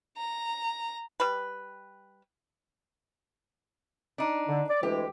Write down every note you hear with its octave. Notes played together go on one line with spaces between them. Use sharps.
A#5
G3 B4
D4 D#4
D3
D5
D2 E3 G#3 G4